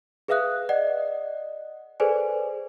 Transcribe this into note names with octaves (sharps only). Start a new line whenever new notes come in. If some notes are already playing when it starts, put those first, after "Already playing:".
G#4 B4 E5 F5 D#6 F#6
D5 D#5 F#5
G#4 A4 B4 C5 D5 G#5